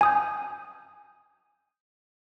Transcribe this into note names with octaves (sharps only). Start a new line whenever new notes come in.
G#5 D#6 G6